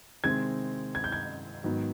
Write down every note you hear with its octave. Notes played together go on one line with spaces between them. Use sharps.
C3 D#3 G#3 C4 G#6
G#6
G6
G#6
G#2 D#3 F#3 B3